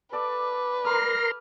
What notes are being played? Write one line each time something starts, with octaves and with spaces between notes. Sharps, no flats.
A4 B4 D5 D6
A#4 A#5 C6 F6